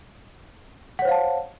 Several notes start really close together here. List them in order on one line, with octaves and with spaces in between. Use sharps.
F#5 C#5 C5 F5 A5